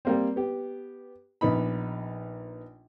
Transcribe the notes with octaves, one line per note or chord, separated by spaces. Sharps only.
G3 A#3 C4
B3 G4
A#1 B3 D#4 B5